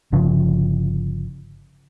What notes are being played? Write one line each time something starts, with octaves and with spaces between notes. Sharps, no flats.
G1 C#3 F3